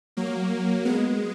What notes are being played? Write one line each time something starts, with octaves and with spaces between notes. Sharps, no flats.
F#3 A#3
G#3 B3